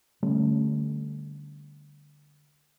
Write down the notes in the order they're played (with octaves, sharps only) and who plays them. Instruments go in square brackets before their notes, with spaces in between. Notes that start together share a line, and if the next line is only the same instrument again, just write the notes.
[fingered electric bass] D3 G3 A3 C#4